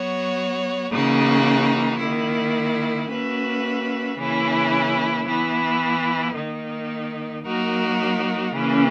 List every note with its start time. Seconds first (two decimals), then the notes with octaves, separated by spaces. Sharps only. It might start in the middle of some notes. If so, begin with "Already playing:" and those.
Already playing: F#3 B3 F#4 C#5
0.90 C#3 E3 A#3 D#4 F#4
1.99 D#3 A#3 E4
3.07 A#3 C#4 F#4 B4 E5
4.16 C#3 E3 A#3 C#4 E4
5.25 E3 B3 E4
6.33 D#3 A#3 D#4
7.43 F#3 A#3 D#4 F#4 A#4
8.51 C#3 E3 A#3 C#4